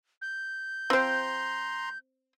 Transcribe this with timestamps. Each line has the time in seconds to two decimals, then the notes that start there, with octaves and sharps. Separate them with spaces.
0.22 G6
0.90 F3 C4 C5 G5 A#5 C6